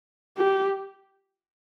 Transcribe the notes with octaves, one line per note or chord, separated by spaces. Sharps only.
G4